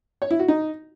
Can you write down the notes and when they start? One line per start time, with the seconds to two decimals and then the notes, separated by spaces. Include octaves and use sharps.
0.22 C#5
0.31 E4
0.39 F#4
0.48 D#4